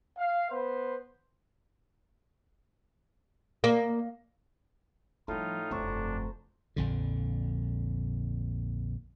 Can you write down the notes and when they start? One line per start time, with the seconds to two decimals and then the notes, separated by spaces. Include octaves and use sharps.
0.18 F5
0.51 B3 B4 C5
3.64 A#3
5.28 A2 F3 G3 D#4 F4
5.71 F1 G2 D4 C5 A#5 C#6
6.76 A#1 F2 D3